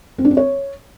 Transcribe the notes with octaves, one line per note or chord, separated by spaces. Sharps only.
C4
D4
C4
C#5